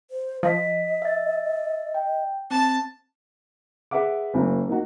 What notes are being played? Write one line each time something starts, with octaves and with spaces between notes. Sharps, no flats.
C5
F3 D#5 D#6 A#6 B6
E5 A6
G5
C4 A5
G#4 B4 E5 F#5 D6
F#1 F#3 A#3
A#3 D#4 F4 F#4